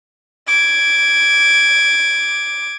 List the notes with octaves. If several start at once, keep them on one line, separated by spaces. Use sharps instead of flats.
D6 G#6